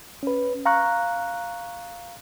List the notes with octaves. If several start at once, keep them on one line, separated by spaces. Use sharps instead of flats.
C#4 B4
F5 A#5 C#6 F#6